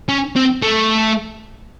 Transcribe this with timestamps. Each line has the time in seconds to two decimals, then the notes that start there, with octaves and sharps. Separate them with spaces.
0.09 C#4
0.36 C4
0.63 A3